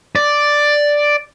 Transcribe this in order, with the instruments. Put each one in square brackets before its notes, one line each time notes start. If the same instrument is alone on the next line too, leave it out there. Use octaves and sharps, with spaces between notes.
[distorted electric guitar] D5